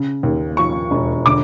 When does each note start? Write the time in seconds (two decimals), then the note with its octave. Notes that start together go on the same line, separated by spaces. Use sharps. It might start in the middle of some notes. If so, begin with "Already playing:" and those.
Already playing: C#3
0.23 D#2
0.57 F3 C#6
0.91 E1
1.25 D3 D6